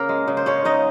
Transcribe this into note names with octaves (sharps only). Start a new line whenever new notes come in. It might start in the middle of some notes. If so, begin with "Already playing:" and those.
Already playing: C#3 A#3 A#4
G#3
C#3
C5
G#3 C#4 C#5
C#3 D#4 D#5